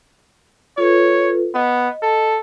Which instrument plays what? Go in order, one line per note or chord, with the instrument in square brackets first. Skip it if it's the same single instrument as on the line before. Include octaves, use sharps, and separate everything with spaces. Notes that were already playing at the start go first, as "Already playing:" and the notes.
[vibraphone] F4 A4 B4 [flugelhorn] C#5
[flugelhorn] B3 [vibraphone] D#5
[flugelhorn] A4